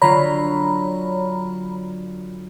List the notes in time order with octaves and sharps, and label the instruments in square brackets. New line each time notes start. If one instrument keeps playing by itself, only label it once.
[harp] D3 F#3 F4 [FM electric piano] C#5 A#5 B5